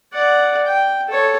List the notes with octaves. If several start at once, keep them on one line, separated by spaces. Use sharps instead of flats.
D5 F#5
G5
A4 C#5